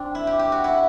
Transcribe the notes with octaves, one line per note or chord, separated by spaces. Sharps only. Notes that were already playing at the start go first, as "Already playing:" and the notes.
Already playing: C4 D4
E4
G4
G4
F#4
E4